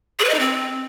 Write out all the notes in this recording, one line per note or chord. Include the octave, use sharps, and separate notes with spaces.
G#4
B4
D#5
D#4
C4